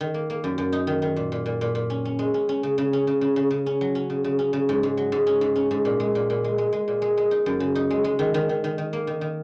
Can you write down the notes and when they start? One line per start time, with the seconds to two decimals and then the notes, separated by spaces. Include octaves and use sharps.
0.01 D#3
0.14 A#3
0.30 A#3
0.44 F#2
0.58 F#2
0.72 D#4
0.87 D#3
1.02 D#3
1.16 A#2
1.32 A#2
1.46 A#2
1.61 A#2
1.75 A#2
1.90 C#4
2.05 C#4
2.19 G#3
2.34 C#4
2.49 C#4
2.63 C#3
2.78 C#3
2.93 C#4
3.07 C#3
3.21 C#3
3.36 C#3
3.51 C#3
3.66 C#4
3.81 F#3
3.95 C#4
4.10 C#3
4.24 C#3
4.39 C#4
4.53 C#3
4.69 G#2
4.83 G#2
4.97 F#3
5.12 G#2
5.27 C#4
5.41 G#2
5.56 C#4
5.71 G#2
5.85 A#2
6.00 G#3
6.15 A#2
6.30 A#2
6.44 G#3
6.58 G#3
6.73 G#3
6.88 A#2
7.02 G#3
7.17 G#3
7.31 D#4
7.46 F#2
7.60 C#3
7.75 D#4
7.90 G#3
8.04 G#3
8.19 D#3
8.34 D#3
8.49 D#3
8.64 D#3
8.78 D#3
8.93 A#3
9.07 D#3
9.21 D#3